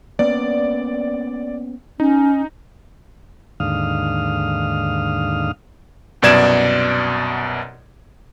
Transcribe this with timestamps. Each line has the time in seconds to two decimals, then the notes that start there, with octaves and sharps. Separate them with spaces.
0.19 A#3 B3 C#4 D5
2.00 C#4 D#4
3.60 D#2 G#2 D3 F5 D#6 F6
6.22 C2 F#2 B2 D5 G#6 E7